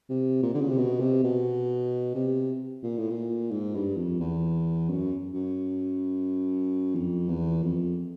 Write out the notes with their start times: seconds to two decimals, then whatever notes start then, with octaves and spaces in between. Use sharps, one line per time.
0.09 C3
0.43 A#2
0.54 D3
0.61 C#3
0.69 C3
0.78 B2
1.00 C3
1.24 B2
2.15 C3
2.83 A#2
2.98 A2
3.10 A#2
3.51 G#2
3.75 G2
3.97 F2
4.20 E2
4.89 F#2
5.34 F#2
6.95 F2
7.29 E2
7.63 F2